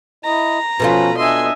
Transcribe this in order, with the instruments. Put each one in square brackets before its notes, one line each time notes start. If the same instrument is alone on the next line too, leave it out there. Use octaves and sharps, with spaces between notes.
[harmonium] E4 D#5 [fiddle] A#5
[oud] B2 A3 F4 [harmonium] F3 C#4 [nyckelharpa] B4
[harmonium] D4 [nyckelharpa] D#5 E5 [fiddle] G#5 C6